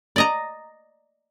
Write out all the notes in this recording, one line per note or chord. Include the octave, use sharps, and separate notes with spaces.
D5 D#5 A#5